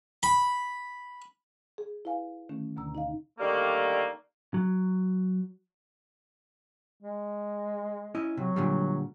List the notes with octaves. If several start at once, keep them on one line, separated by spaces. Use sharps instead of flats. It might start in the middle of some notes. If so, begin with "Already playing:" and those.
B5
G#4
E4 B4 F5 G#5
D3 D#3 A3 C#4
D2 B2 D3 A#5 E6
D#4 D#5 F5
D3 D#3 G3 A3 A#3
F#3
G#3
C#4 E4 D#5
C3 F#3
A#2 D3 G3